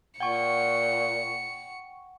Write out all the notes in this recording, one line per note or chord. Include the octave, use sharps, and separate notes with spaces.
A#2 F#5 G5 C#6 C#7